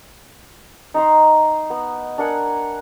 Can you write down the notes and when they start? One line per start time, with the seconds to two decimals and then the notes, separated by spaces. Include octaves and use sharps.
0.94 D#4 A#5 C6
1.70 B3
2.18 D4 A#4 F#5 G#5